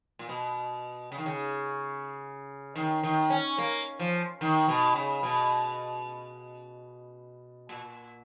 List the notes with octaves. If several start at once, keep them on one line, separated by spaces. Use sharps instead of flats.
A#2
B2
C#3
D#3
C#3
D#3
D#3
C#4
A#3
F3
D#3
B2
C#3
B2
A#2